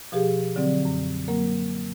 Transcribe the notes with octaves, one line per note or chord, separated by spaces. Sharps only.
B2 F3 G4 G#4
D3 F#3 C4 D5
F#2
F#3 A#3 A#4